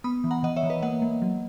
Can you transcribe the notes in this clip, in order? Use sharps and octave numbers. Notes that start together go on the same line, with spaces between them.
B3 B5 D#6
E3
F#5 A#5
E3 D#5 F#5
C#5 E5
E3
B4 D#5
A#3 D#5 F#5
A#3
F#3